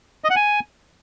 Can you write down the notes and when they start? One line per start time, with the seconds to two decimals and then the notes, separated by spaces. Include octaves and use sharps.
0.24 D#5
0.30 F#5
0.36 G#5